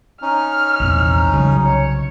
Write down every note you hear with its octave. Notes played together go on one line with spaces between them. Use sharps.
C#4 D#4 F6
A#1 E2 C3
C2 C#3 F#3
C#5